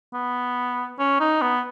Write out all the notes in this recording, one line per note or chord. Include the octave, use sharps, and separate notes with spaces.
B3
C#4
D#4
B3